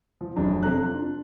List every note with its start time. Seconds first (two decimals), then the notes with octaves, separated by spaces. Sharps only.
0.21 F3
0.36 F1 F#2 D4 A#5
0.63 F2 C3 A4 A#5 F#6
0.82 F4
0.95 D4